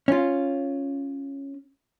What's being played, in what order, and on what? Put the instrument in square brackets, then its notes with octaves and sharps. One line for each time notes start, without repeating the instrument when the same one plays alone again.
[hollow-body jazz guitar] C#4 F4